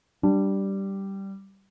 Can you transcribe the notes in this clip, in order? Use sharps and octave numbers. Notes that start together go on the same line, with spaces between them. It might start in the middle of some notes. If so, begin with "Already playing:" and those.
G3 D4